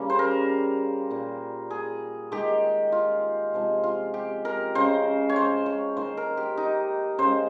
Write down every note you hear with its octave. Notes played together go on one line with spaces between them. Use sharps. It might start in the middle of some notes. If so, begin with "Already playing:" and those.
Already playing: C#3 G3 A#3
C5
A#4
A#2 G3 A#3
G#4
D#3 G#3 G4
F4
C3 F3 G#3
F4
G4
A#4
C#3 G#3 C5
C#5
C5
C#5
D#3 A#3 C5
A#4
G4
D#4
C#3 G#3 C5